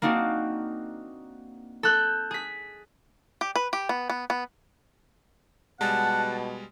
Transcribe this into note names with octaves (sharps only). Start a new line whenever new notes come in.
A#3 C4 D4 D#4 F#4
A4 F#6 G6
G#4 B6
G4
B4
G4
B3
B3
B3
B2 G3 G#3 F#5 A5